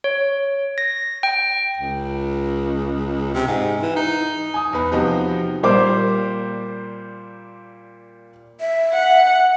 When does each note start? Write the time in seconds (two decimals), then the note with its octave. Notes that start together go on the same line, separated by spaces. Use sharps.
0.04 C#5
0.78 A#6
1.23 G5
1.77 C#2
3.34 C3
3.48 G#2
3.82 E3
3.96 D#4
4.54 G#5 D#6
4.73 E2 B4
4.92 C3 F3 B3 D#4 F#4 G4
5.63 A#2 G3 A#3 C5 D6
8.60 E5
8.92 F#5